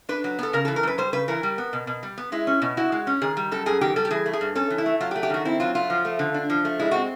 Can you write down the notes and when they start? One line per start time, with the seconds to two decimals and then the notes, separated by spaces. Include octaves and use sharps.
0.09 D4 B4
0.24 F#3
0.39 B3 A4
0.53 C#3 A#4
0.65 A4
0.68 E3
0.76 A#4
0.83 F#2 B4
0.98 G3 C5
1.13 C#3 B4
1.28 E3 A#4
1.43 G3
1.58 B3
1.73 B2
1.87 B2
2.03 G3
2.18 B3
2.32 G#3 E4
2.47 C#4
2.62 B2
2.77 E4 F#4
2.92 G#3
3.07 C#4
3.22 D#3 G#4
3.37 G3
3.51 F#2 A4
3.66 F#2 G#4
3.81 D#3 G4
3.96 G3 A4
4.05 G4
4.11 E3 G#4
4.26 A3
4.33 G#4
4.41 G2
4.55 C#4 A4
4.70 E3
4.78 E4
4.86 A3
5.00 F#3 F4
5.11 G4
5.16 A3
5.23 G4
5.30 D#3 F#4
5.45 C4 E4
5.60 F#3 F4
5.75 A3 F4
5.90 F3
6.05 A3
6.19 D3
6.34 D4
6.50 F3
6.65 A3
6.79 G#3 E4
6.91 C4 F#4